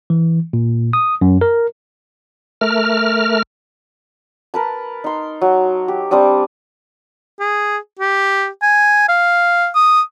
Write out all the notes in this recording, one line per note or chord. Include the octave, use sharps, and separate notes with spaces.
E3
A#2
D#6
F#2
A#4
A3 A#4 F6
A#4 B4 A5
D#4 C6
F#3
G4
G3 C4 D4 D#6
G#4
G4
G#5
F5
D#6